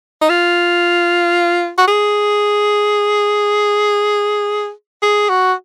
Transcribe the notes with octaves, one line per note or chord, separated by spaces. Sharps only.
D#4
F4
F#4
G#4
G#4
F#4